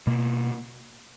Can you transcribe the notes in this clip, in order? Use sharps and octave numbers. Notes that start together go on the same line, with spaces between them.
B2 A#3